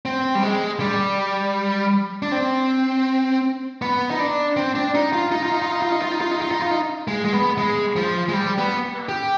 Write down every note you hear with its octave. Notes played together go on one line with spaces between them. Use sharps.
C4
G3
G#3
G3
D4
C4
B3
D#4
D4
C4
D4
D#4
F4
D#4
F4
D#4
F4
D#4
F4
D#4
F4
D#4
F4
D#4
F4
D#4
F4
D#4
G#3
G#3
B3
G#3
F3
G#3
G3
B3
G4